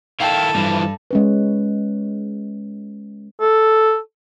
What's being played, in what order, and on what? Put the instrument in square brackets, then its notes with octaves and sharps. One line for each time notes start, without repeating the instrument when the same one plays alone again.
[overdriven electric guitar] D#3 E4 [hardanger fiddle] A4 [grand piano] F5 G5
[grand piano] G2 [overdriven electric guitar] E3 F3
[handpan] G#3 C#4 B4
[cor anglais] A4